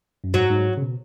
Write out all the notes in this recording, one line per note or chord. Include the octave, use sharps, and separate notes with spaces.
F#2
G#2 F#3
G#2
C#3
B2